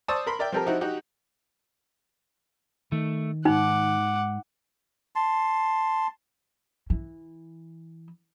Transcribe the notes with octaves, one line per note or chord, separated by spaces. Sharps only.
C5 D5 A5 C#6 D#6 E6
A#4 B5 C6
A#4 D5 E5 G5
F3 C4 G4 A4 A#4
F3 D#4 E4 F#4
D#4 F#4 G4
D#3 A3
E2 G#2 D#4 F#5 D6
A5 C6
E3